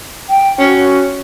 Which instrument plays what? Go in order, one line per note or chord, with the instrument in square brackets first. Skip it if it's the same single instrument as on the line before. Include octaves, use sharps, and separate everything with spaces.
[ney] G5
[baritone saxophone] C#4 [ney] F#4